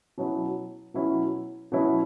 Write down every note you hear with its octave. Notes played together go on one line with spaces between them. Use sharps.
B2 F#3 C#4 E4
B2 F#3 C#4 E4
B2 F#3 C#4 E4